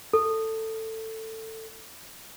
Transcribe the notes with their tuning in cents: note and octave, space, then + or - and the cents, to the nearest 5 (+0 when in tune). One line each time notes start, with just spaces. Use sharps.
A4 +15